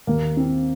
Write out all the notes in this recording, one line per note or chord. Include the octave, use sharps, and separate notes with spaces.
D#2 A#3
C4